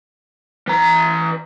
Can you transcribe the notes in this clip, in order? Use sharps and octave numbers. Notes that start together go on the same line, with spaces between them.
E3 A#5